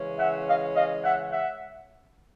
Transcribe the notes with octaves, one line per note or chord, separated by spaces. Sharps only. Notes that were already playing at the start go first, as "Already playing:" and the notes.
Already playing: C#3 E3 G#3 C#4
E5 F#5
D#5 F5
D#5 F5
E5 F#5
E5 F#5